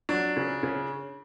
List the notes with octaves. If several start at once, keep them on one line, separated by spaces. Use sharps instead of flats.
F#3 D4
C#3
C#3